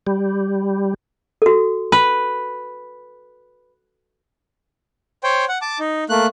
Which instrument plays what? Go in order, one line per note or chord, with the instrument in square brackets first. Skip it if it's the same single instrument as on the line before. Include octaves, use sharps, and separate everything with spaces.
[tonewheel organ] G3
[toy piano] F#4 A4
[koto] B4
[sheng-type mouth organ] C5 C#5 G5
F#5
A5 D6
D#4
A3 A#3 F#6